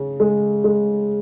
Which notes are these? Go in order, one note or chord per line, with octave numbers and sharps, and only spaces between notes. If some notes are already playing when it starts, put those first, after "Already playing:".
Already playing: C#3
G#3
G#3